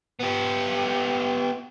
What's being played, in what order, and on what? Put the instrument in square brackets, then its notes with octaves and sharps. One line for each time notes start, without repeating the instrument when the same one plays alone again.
[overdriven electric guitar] B3 G4